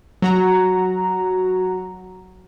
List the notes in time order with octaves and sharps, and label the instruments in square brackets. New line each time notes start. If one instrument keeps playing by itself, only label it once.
[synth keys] F#3 F#4 A#5